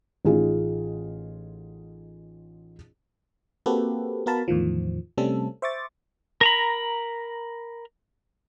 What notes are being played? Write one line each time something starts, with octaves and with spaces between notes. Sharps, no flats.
A1 D#4 F4 G#4
A#3 C4 F#4 G4 A4 B4
B3 F#4 A#4 F5 A5 B5
E2 A2 D#3 F3
C3 G3 A3 C4 C#4 A4
C5 E5 C#6 D6 A6
A#4 A#5 B5